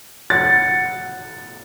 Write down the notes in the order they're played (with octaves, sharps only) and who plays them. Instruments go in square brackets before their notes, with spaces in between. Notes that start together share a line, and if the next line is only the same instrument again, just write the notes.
[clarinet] F#5 [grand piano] A6